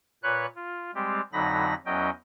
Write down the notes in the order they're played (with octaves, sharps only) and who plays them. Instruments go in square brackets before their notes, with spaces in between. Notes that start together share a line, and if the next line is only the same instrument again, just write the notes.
[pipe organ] A#2 B4 C#5 F#6
F4
G3 G#3 C4 G4
F2 D3 F#3 D#4 B5 A#6
E2 F#3 C#4 D#5 G5